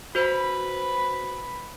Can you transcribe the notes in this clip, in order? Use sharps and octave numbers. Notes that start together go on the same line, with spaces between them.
F#4 B4 C5 B5